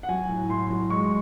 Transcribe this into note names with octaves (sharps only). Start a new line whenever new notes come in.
F#5
F#3 G#5
A2
A2 C6
F#3
G#3 C#6